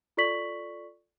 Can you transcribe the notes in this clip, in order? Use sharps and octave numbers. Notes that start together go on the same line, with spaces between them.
F4 A4 D5 C#6 B6 F#7